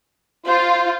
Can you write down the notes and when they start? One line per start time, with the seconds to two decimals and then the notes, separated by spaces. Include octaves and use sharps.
0.46 F4 C5